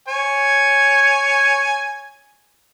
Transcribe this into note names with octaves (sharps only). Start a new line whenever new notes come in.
C#5 G#5